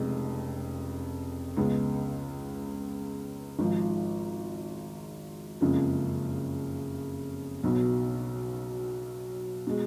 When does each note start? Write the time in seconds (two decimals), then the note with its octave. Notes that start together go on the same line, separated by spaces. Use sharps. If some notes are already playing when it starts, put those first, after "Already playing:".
Already playing: F1 F2 C#3 G#3
1.57 C#2 C#3 G#3 B3
3.59 G#1 G#2 F3
5.61 F#1 F2 C#3 F3 G#3
7.63 B1 B2 F#3 B3
9.67 B2 G#3